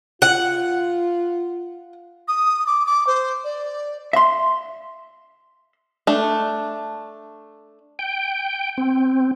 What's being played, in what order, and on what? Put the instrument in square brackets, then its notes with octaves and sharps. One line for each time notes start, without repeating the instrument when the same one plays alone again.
[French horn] F4 [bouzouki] F#5
[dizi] D#6
D6
D6
C5
D5
[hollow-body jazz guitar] E5 C6
[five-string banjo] A3 D4
[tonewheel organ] G5
C4